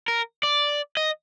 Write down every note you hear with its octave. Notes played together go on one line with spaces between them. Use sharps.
A#4
D5
D#5